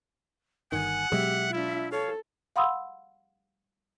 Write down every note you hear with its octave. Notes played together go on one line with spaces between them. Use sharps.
G1 D#3 F#5 G#5
B2 F#3 G#3 G4 E5
D4 E4 F4
A4 C#5 F5
F5 F#5 B5 C6 D#6 E6